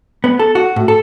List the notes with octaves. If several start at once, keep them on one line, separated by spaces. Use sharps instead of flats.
B3
A4
F#4
A2
A4